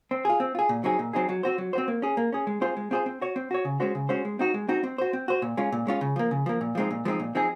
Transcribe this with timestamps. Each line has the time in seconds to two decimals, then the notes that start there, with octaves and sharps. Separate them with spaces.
0.11 C4
0.25 F4 G#4
0.40 C4
0.55 F4 G#4
0.69 A#2
0.84 F#3 C4 D#4 G#4
0.99 A#2
1.13 F#3 C4 D#4 G#4
1.29 F#3
1.43 C4 F#4 C5
1.58 F#3
1.73 C4 F#4 C5
1.88 A#3
2.02 C#4 G#4
2.17 A#3
2.32 C#4 G#4
2.47 G#3
2.61 C4 F4 G#4 C5
2.77 G#3
2.91 C4 F4 G#4 C5
3.06 C4
3.21 F#4 C#5
3.36 C4
3.51 F#4 C#5
3.65 C#3
3.80 G#3 C#4 F#4 C5
3.95 C#3
4.09 G#3 C#4 F#4 C5
4.25 G#3
4.39 C4 D#4 F#4
4.54 G#3
4.69 C4 D#4 F#4
4.84 C4
4.98 F#4 C5
5.13 C4
5.28 F#4 C5
5.42 A#2
5.57 G#3 C#4 F4
5.72 A#2
5.87 G#3 C#4 F4
6.01 C#3
6.16 F3 A#3
6.31 C#3
6.46 F3 A#3
6.61 A#2
6.75 F3 G#3 C4 D#4
6.91 A#2
7.05 F3 G#3 C4 D#4
7.20 A#2
7.35 F3 C4 D#4 G#4